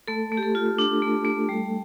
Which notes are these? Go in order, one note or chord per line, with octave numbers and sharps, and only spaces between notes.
A3 A4
A3
G4
A4
F4
D4
A3
A3
G3